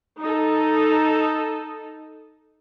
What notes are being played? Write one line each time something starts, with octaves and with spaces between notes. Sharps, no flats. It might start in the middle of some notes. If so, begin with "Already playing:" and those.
D#4 A4